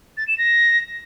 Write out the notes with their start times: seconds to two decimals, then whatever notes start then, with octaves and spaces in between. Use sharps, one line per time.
0.17 A6
0.28 E7
0.38 A#6